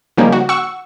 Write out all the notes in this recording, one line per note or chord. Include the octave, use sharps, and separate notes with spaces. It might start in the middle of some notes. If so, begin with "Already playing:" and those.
C#3 F3 G3 A#3 C#4 D#4
F#4
F#5 C#6 E6